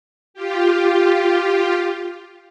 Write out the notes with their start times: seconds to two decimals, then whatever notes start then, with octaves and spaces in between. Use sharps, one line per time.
0.34 F4 G4